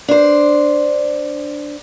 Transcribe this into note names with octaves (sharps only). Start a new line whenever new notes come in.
D4 C5